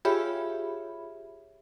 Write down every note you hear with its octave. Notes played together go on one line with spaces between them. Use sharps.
F4 G4 G#4 C#5 E5 B5